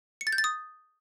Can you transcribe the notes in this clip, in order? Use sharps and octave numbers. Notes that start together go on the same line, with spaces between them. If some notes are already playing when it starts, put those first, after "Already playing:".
C#7
A6
G6
A6
D#6